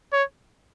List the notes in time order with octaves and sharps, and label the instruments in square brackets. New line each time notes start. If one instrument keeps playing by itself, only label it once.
[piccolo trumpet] C#5